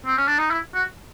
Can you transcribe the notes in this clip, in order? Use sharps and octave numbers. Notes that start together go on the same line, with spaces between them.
C4
C#4
D4
D#4
E4
F#4